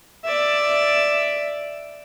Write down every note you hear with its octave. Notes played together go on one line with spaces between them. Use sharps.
D5 E5